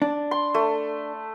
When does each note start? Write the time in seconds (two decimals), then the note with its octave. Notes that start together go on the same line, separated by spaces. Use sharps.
0.02 D4
0.31 C6
0.54 A3